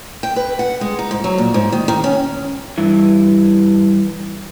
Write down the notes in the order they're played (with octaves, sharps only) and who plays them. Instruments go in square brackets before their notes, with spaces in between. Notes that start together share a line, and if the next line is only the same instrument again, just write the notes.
[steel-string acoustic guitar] G5
B4
F#5
G#3
D#4
G#2
F#3
A#2
G#2
D#3
D#3
C#4
[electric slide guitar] G2 E3